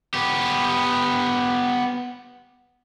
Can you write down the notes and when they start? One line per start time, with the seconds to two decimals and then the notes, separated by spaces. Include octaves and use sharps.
0.14 B3 G4